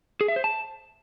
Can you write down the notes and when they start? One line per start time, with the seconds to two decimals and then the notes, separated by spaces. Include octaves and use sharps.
0.21 G#4
0.28 E5
0.36 C5
0.44 A5